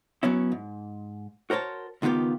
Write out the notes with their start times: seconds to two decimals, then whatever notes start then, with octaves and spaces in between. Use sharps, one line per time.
0.23 F#3 B3 C#4 E4
0.52 G#2
1.50 F#4 A#4 C5 C#5 A5
2.02 C#2 D#3 B3 F4 G4